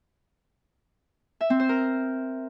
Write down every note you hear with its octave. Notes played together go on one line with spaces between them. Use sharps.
E5
C4
C5
A#4